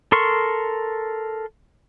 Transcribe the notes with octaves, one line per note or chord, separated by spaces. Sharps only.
A4 A#4 C6 C#6